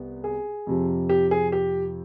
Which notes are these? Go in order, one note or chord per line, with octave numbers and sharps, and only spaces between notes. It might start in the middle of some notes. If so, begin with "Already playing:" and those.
Already playing: C2 C3 G3 B3
G#4
F2 C3 F3
G4
G#4
G4